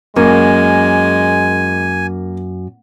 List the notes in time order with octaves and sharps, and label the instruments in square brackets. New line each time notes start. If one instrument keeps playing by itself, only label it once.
[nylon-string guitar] F#2 [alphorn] G#3 [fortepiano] A#3 [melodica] G#5